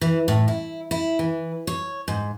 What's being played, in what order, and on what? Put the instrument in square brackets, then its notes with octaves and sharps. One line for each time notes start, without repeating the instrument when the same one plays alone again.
[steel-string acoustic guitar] E3
A2
E4
E4
E3
C#5
G#2